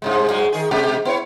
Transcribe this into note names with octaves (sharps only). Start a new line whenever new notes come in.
G2 C3 G#3
G2 F#3 G#3
D#3 G#4
B2 G#3 G4
B3 E4 C#5